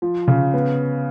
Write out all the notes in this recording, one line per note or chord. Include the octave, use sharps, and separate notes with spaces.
F3
C#3
B3